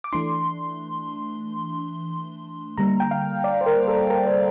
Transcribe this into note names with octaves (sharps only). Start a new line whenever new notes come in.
D6
E3 A3 D4 C6
D3 G3 A#3 A#5
G5
F5
D5
C5
A#4
A4
A#4
C5